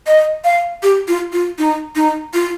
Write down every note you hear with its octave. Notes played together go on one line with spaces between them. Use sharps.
D#5
F5
G4
F4
F4
D#4
D#4
F4